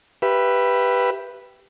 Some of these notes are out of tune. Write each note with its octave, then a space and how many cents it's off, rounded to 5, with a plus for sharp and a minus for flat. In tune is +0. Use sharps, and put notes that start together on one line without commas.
G4 +0 B4 -5 E5 +25